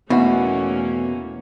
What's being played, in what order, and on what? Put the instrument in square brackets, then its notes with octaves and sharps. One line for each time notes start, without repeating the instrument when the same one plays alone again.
[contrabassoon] E2 [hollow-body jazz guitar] B2 [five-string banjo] E3 F#4 [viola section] A3 A#3 C#4